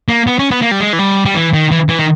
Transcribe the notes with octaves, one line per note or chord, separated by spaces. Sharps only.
A#3
B3
C#4
B3
A#3
G3
G#3
E3
G3
G3
E3
D#3
E3
E3
D#3